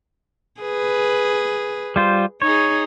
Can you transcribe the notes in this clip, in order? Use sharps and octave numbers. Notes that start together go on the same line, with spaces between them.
G#4 B4
G3 F4 C5
D#4 G#4 C#5